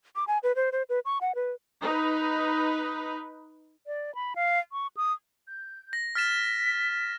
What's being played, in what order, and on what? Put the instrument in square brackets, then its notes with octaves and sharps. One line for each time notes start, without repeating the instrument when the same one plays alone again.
[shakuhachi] D6
G#5
B4
C5
C5
B4
C#6
F#5
B4
[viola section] D#4 B4
[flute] D5
B5
F5
C#6
D#6
[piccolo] G6
[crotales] A#6
[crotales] F6 A6 E7 [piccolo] B6